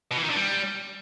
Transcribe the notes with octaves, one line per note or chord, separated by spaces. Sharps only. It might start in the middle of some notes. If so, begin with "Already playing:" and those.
B2
E3
D#3
D3
G3